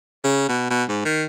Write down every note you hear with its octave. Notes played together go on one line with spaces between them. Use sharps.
C#3
B2
B2
G#2
D#3